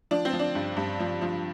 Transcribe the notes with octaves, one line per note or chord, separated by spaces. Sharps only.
F3 D4
C4
F3
D4
G2
G2
F3
F3